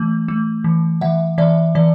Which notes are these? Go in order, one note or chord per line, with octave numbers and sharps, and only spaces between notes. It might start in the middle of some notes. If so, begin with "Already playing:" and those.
Already playing: E3 A3
A3
E3
E3 E5 F#5
E3 D5 E5
E3 D5